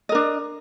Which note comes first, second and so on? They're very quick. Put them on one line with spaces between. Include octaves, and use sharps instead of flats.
D#5 A#4 D4